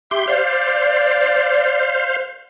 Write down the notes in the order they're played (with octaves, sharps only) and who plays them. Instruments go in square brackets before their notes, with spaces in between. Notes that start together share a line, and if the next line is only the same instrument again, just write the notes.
[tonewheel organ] G4 C6 [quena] E5
[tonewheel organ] C5 F5 [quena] D5